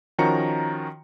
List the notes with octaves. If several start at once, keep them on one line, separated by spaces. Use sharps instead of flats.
D#3 F3 C#4 F#4 A#5 C#7